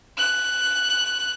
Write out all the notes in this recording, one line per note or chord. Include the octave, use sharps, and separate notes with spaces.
F#6